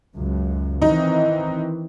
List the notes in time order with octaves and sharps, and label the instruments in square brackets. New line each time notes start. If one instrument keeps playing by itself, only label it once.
[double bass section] C#2 F#2
[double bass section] D#3 E3 C4 [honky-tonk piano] D#4